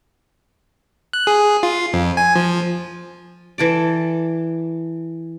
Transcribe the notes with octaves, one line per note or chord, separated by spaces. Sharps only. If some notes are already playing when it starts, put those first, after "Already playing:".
F#6
G#4
F4
F2
G#5
F3
E3 A4 D5